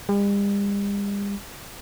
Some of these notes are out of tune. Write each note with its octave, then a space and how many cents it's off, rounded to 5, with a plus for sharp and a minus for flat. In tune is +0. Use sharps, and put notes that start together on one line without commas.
G3 +45